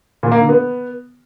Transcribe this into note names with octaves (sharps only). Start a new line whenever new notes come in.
A#2
A#3
D3
B3